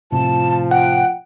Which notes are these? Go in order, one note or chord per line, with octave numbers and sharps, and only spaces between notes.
A2 C3 F3 A5
F#5 G5